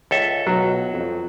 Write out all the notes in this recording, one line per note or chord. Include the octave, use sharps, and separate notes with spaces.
C#2 A4 E5
B2 F#3
F2